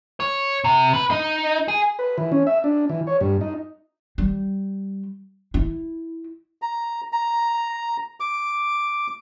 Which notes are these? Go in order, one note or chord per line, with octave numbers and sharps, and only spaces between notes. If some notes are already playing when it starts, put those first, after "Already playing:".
C#5
C3
B4
D#4
G#4
B4
E3
C#4
E5
D4
E3
C#5
G2
D#4
G3
E4
A#5
A#5
D6